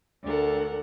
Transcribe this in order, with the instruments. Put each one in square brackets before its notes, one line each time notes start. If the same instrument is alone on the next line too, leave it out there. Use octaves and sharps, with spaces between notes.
[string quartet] D2 D4 A4 A#4 F#5